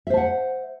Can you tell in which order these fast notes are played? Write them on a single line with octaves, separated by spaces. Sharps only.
E5 C5 A5 F#5